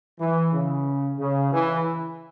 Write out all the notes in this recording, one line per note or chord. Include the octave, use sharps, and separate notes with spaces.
E3
C#3
C#3
E3